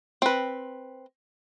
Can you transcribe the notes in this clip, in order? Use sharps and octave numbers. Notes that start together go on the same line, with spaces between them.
C4 B4